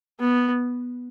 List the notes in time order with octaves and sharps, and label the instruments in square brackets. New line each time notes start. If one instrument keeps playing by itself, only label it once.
[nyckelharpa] B3